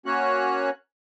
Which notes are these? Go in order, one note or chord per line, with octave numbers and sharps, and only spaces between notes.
A#3 C#4 F#4 C#5 F#6